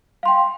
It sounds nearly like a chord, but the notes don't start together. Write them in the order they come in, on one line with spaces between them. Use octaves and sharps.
F5 C6 G5